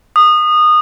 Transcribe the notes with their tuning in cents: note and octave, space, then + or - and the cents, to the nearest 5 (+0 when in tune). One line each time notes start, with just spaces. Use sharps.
D#6 -20